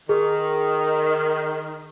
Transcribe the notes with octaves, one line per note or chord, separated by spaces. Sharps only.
D#3 G#4